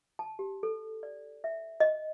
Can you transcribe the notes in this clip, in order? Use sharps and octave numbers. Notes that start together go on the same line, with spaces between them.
A5
G4
A4
D5
E5
D#5